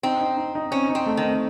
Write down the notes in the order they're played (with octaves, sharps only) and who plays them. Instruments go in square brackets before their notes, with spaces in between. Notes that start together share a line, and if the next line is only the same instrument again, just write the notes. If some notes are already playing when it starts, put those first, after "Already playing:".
[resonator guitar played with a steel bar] C4 [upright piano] D#4
[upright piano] D#4
D#4
D#4
[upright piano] C4 [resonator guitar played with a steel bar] C#4
[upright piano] D#4
[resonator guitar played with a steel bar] C4
[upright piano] A3
[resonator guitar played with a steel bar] D#3
[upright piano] C4